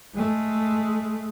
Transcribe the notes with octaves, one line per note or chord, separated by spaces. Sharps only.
G#3 A3